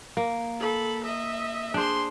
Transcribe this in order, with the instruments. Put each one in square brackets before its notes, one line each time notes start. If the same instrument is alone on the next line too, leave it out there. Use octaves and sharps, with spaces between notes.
[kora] A#3
[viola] A4 B5
D#5 E5
[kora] D4 C5 [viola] G#4 C6